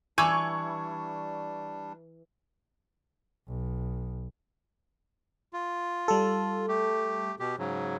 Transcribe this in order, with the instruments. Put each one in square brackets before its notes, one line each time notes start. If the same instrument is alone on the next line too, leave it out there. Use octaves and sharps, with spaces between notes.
[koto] E3 [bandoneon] G3 D4 [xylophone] G#5 D6 E6 [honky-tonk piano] C#6 G#6
[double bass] B1
[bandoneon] F4
[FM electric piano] G3 A4
[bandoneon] A3 G4
B2 G4
G#2 C#3 F#3